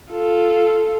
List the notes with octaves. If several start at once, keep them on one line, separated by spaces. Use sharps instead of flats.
F4 A4